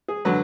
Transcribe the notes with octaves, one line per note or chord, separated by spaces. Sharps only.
G#4
D3 F#3 B4